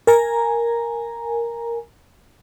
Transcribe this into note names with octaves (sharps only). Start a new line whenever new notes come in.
A#4 G#5 A#5